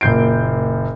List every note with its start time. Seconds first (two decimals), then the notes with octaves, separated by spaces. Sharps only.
0.01 F#1 A#2 G6 C7 D7